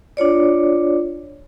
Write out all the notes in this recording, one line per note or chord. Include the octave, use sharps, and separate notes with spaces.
D4 F4 C#5 D5